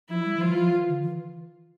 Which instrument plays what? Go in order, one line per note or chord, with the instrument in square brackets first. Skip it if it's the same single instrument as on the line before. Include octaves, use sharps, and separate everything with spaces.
[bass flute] F3 [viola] E4
[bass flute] G3
E3
[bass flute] F3 [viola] F4
[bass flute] F3
E3
D3
E3